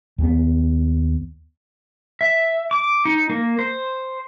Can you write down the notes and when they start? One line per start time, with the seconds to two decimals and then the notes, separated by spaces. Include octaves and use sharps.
0.18 D#2 B3
2.21 E5
2.71 D6
3.05 D#4
3.30 A#3
3.59 C5